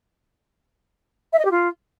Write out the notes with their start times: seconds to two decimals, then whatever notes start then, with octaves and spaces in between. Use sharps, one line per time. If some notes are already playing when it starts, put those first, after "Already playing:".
1.33 E5
1.39 D#5
1.45 G4
1.51 F4